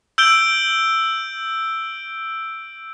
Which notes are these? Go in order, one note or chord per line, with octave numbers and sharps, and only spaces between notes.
E6 G6 D7 G7